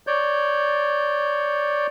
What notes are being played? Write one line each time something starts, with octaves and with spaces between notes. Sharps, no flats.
C#5 D5 G6